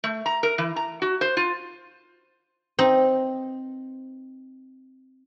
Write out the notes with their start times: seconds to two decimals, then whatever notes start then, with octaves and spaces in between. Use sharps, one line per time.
0.04 A3
0.26 A#5
0.43 A#4
0.58 E3
0.76 A#5
1.02 F#4
1.21 C5
1.37 F4
2.79 C4 D#4